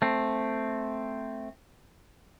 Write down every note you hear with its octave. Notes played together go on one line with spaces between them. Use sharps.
A3 C4